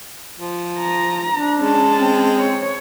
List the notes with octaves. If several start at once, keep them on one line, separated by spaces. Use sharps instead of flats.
F3
A#5
D4
G#3 C#4 A5
C4
C#5